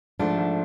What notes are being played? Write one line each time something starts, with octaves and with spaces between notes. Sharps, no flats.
G#2 F3 A3 D4
G#2